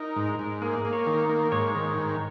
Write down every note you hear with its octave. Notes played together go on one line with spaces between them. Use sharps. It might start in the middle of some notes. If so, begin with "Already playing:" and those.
Already playing: D#4 A#4
G#2
G#2
A#3 G#4
A#3
C#5
D#3
A#3
G#2 C#5
D#3
G#2